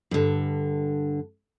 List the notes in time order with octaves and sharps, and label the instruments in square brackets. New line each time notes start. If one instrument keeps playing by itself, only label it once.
[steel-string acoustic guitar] G2 D3